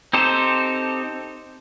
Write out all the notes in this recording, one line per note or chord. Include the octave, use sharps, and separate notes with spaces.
C4 D#4 G4 A4 C5